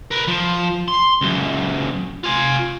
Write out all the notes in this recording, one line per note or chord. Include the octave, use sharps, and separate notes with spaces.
A#4 B4
F3
C6
C#2 F#2
F4 G#5